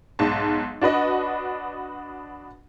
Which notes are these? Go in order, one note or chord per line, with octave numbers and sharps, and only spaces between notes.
B1 G#2 A5
D4 F#4 B4 D#5